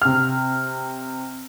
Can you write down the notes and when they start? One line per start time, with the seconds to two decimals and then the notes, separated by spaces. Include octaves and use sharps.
0.02 C3 F6